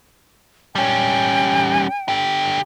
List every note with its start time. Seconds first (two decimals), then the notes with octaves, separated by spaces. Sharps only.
0.75 G3 C#4 G5
2.09 D3 G4